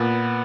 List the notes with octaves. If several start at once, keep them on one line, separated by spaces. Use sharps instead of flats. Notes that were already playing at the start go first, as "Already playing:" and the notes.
Already playing: A#2 B3